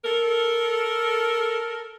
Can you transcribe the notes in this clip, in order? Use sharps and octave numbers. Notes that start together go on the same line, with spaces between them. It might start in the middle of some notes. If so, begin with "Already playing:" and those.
A4 A#4